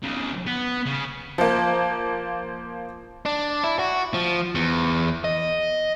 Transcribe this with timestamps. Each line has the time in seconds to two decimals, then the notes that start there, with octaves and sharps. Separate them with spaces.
0.03 B1 C#3
0.47 B3
0.86 C#3
1.38 F3 A#3
3.25 D4
3.64 E4
3.79 F#4
4.14 F3
4.55 E2
5.24 D#5